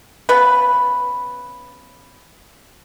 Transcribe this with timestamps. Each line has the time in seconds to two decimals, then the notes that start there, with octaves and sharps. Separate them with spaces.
0.29 C#3 B3 B4